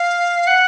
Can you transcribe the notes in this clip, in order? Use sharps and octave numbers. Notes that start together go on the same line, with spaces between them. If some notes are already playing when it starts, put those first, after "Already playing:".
Already playing: F5
F#5